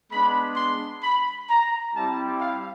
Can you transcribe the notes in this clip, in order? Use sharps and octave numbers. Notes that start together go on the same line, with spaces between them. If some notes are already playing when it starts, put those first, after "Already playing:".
G#3 B3 D4 B5
C6
B5
A#5
G3 C4 E4 G4 A5
F5